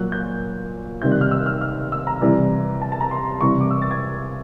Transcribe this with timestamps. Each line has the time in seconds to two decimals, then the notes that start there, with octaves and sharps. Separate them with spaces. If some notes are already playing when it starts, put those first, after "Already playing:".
Already playing: A#2 F#3 F#6
0.12 G6
1.02 C3 D#3 G3 G6
1.12 F#6
1.21 F6
1.31 E6
1.46 F6
1.61 F6
1.92 E6
2.07 A#5
2.21 C3 E3 G3
2.82 A5
2.92 A5
3.01 A#5
3.11 C6
3.41 C3 E3 G3 C#6
3.61 D6
3.71 E6
3.82 A6
3.91 G#6